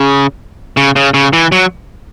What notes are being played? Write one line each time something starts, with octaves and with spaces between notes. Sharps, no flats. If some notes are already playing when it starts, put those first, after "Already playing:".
Already playing: C#3
C#3
C#3
C#3
E3
F#3